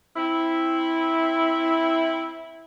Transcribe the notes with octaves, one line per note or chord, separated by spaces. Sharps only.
C4 E4